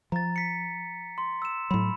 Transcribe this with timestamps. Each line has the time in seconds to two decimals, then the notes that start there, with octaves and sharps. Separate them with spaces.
0.12 F3 A#5 A6
0.36 B6 C#7
1.18 C6
1.42 E6 E7
1.71 A2 F#3 B5